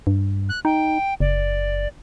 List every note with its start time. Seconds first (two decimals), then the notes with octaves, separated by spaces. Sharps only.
0.07 G2
0.49 F#6
0.65 D#4 G5
1.20 F#1 D5